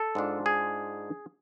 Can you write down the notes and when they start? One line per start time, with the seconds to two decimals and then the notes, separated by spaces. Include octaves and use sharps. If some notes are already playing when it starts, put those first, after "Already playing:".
Already playing: A4
0.15 G#2 G#3 D4 F4
0.46 G#4